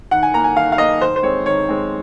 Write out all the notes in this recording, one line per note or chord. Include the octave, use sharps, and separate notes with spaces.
D#3 F#5
G#5
A#3 A#5
G#5
D#3 F5
F5
A#3 D#5
D#3 C5
C5
G#3 C4 C#5
D#3 C#5
G#3 C4